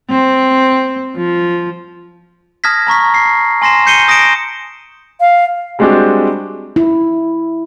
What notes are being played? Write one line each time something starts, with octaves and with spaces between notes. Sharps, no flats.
C4
F3
A5 D#6 F6 G#6 A#6 B6
A5 A#5 C#6 B6
C7
G#5 C6 A#6 C7 E7
G6 C7 C#7 D#7 G7
D#6 A#6 C#7 D7 E7
F5
G3 G#3 C4 D4 F#4 G4
E4